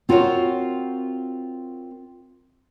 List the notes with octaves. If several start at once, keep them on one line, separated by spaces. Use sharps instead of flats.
C4 F4 F#4 A#4 C#5